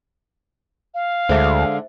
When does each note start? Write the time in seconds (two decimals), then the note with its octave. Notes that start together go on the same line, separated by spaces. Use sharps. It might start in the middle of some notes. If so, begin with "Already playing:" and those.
0.94 F5
1.29 D2 D3 G#3 D4 C5 E5